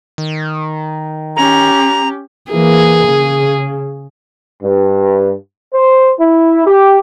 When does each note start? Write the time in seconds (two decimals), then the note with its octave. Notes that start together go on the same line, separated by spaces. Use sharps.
0.18 D#3
1.36 C#4 G4 A#5
2.52 E3 A#3 G#4
3.07 C#3
4.63 G2
5.74 C5
6.19 E4
6.67 G4